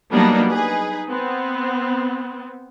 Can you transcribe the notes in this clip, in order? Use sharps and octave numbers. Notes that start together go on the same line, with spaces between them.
F#3 G3 A#3 B3 D4 D#4
D#4 G#4 B4
B3 C4